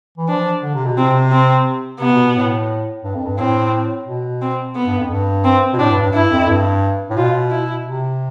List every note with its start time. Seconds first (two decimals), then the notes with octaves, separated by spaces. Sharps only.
0.18 E3
0.28 F3 D4
0.62 D3
0.75 C3
0.86 B2
0.97 C3 C4
1.32 C4
2.00 C3 B3
2.12 B2
2.23 B2
2.36 A2
3.04 G2
3.15 F2
3.26 G2
3.38 A2 C4
4.07 B2
4.42 C4
4.75 B3
4.87 G2
4.99 F2
5.10 G2
5.44 C4
5.74 B2
5.79 A2 D4
5.91 G2
6.01 G2
6.13 G2 E4
6.31 F2
6.47 G2
7.10 A2
7.17 B2 F4
7.51 E4
7.85 C3